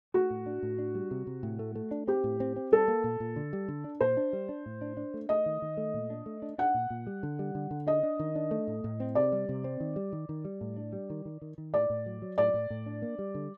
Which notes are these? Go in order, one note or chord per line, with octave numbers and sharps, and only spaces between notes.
A3 F#4
A2
D4
A2
D4
G3
C3
C3
A2
A3
A3
D4
C4 G4
A2
C4
C4
G3 A4
A#3
A#2
A#2
D3
G3
D3
D4
A#2 C5
D4
G3
D4
A2
D4
D4
A3
A3 D#5
D#3
D#3
A3
A#2
D4
A3
D4
D4 F#5
A#2
A#2
G3
D3
G3
D3
D3
D4 D#5
D4
D#3
D4
A3
A2
A2
C4
C3 D5
G3
C3
C4
D#3
G3
D#3
D#3
G3
A2
D4
G3
D#3
D#3
D#3
D#3
A2 D5
A2
F#3
F#3
A2 D5
A2
A2
D4
A#3
G3
D3